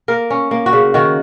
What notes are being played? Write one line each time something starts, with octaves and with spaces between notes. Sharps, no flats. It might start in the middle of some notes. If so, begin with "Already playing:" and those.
A#3 A#4
C#4
A#3
F#4
C#3
D#3 F#4